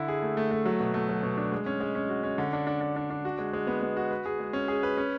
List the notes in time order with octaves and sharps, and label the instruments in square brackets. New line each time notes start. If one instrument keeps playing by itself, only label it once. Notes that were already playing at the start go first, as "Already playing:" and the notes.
Already playing: [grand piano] D3 E4
G#4
A3
A3
A3
F#3
B2
A3
F#3
B2
D4
G#3
C#4
G#3
C#4
F#4
C#4
D3
D4
D4
D4
D4
D4
F#4
G#3
G#3
B3
B3
F#4
B4
G#4
G#3
C#4
G#4
B4
C#4